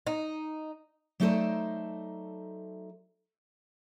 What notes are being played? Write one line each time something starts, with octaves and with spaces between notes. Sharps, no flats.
D#4
F#3 A3 D#4 A4 C5 D5